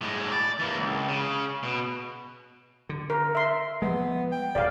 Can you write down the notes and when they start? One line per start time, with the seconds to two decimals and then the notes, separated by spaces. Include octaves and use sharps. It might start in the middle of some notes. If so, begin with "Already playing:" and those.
0.01 A2 G#3
0.32 D5
0.59 E3 A#3
0.78 C#2
1.08 C#3
1.63 B2
2.89 D3
3.10 A#4
3.35 E5 C6
3.82 F3 G3 G#3 B3
4.32 G5
4.55 D#1 D5 F5